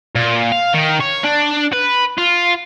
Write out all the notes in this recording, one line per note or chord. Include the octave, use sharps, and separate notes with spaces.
A#2
F5
D#3
C#5
D4
B4
F4